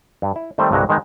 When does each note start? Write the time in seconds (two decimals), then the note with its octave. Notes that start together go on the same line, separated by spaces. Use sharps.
0.22 G2
0.36 E4
0.58 D#3 G3 A3 C4 C5 D5
0.72 C2 G2 D3 G#3 F#4 A#5
0.89 D#3 G#3 B3 D#4